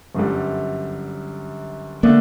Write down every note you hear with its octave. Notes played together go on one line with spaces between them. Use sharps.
G1 F#2 D3 G3
D3 A3 A#3 D4